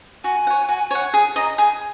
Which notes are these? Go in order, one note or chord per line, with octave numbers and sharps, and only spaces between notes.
F#4 G#5
C#5 F#5
F#4
C#5 F#5
G#4
D#5 A#5
G#4